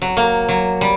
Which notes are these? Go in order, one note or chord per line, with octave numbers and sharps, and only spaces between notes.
F#3
A#3
F#3
G3